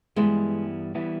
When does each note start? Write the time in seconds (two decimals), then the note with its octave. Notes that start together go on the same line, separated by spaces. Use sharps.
0.16 G2 E3 G3 G#3 B3 E4
0.95 E3 G3 B3 E4